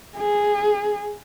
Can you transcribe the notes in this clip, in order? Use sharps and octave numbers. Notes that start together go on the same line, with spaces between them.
G#4